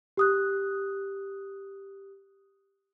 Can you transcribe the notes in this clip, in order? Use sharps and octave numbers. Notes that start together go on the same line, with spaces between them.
G4 D#6 F#6